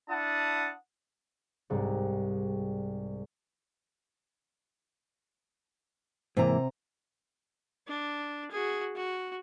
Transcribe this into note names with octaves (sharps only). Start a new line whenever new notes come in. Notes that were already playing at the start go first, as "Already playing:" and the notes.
D4 E4 F#5 A5 D#6
C2 G#2 G3 G#3 C4
G#2 C3 E3 A#3 A#5
D4
F#4 G#4
F#4